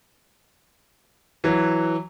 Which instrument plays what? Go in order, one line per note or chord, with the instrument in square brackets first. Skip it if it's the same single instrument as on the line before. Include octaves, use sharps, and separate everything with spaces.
[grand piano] E3 F#3